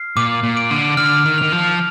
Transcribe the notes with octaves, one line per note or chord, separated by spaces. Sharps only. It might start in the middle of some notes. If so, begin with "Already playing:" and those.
Already playing: F6 C7
A#2 D6
A#2
D7
D3
D3 F6
D#3
D#3 F7
F3